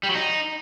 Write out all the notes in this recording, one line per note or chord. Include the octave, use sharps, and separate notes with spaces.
G3
F#3
D#4